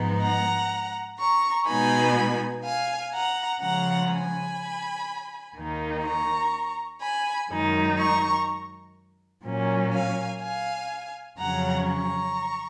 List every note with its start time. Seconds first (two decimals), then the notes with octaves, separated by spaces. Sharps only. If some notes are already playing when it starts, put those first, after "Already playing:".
Already playing: G#2 F3 G#3 B3 D#4
0.21 F#5 A#5
1.19 A#5 C#6
1.67 B2 G#3 B3 D#4 G#5 B5
2.64 F5 G#5
3.13 F#5 A#5
3.61 C#3 F3 G#3 F#5 A#5
4.10 G#5 B5
5.55 D#2 D#3 A#3 D#4
6.04 A#5 C#6
7.01 G#5 B5
7.50 F#2 D#3 G#3 D#4
7.98 A#5 C#6
9.44 A#2 F#3 C#4
9.93 F5 G#5
10.41 F5 G#5
11.38 F2 C#3 F#3 C#4 F#5 A#5
11.86 A#5 C#6